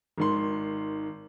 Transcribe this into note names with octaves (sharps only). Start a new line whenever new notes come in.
G#1 D#3 C6